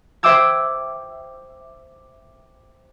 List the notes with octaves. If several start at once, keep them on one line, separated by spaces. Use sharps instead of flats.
C5 E5 G5 D6 E6 G#6